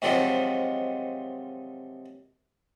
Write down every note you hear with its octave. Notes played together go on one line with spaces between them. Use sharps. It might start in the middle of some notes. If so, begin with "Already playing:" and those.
G#2 C3 D#3 F3 F#3